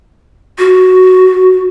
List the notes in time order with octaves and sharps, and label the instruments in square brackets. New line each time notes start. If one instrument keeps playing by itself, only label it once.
[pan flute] F#4